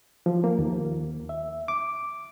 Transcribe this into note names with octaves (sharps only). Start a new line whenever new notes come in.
F3
A#3
D#2
E5
D6